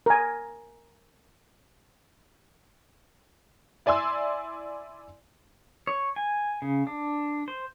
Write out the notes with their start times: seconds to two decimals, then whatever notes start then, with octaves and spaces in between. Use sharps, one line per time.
0.06 A#4 G#5
3.86 E4 D5 G#5 C6 E6
5.87 C#5
6.16 G#5
6.62 C#3
6.87 D4
7.48 C5